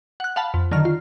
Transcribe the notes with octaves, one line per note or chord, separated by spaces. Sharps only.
F#5 F#6
F5 F#5 A5 B5
F2
D3 D#3 F#3 F6
F4